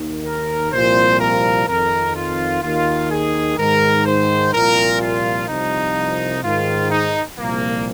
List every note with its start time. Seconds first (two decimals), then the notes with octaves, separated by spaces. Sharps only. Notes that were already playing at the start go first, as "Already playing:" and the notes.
Already playing: D#2 D#3
0.25 A#4
0.72 C2 A#2 F3 C5
1.20 A#4
1.68 F2 D#3 A#4
2.15 F4
2.63 D#2 D#3 F4
3.11 G#4
3.58 G#2 D#3 A#4
4.05 C5
4.53 C2 A#2 F3 A#4
5.01 F4
5.48 C2 C3 F3 D#4
6.43 G#2 D#3 F4
6.91 D#4
7.38 C2 A#2 F3 A#3